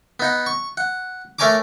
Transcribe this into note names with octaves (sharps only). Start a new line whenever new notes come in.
B3 D#4 F#5
C#6
F#5
A3 A#4 C#5 G#5 A#5 D6